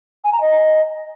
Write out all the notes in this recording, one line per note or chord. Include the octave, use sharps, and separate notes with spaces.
G#5
A#5
D#5